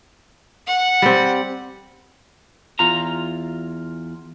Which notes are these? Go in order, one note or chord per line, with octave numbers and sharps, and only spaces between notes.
F#5
G3 C4
E2 F4 A#5